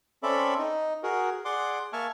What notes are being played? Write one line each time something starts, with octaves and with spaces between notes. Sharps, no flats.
C4 C#4 A4 D5 E5 B5
D#4
F#4 G#4 A#4
G#4 D5 F#5 C6 D6
A#3 E5 G#5 A5 C#6 F6